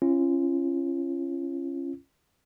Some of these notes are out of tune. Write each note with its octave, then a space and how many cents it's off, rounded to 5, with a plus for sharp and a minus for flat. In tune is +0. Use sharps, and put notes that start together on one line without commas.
C#4 -20 F4 -40